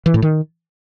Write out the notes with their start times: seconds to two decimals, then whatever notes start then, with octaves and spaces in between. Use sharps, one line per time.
0.06 E3
0.14 A2
0.22 D#3